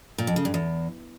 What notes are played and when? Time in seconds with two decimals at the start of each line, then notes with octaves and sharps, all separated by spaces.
0.18 A#2
0.27 F2
0.36 C#3
0.45 G2
0.54 E2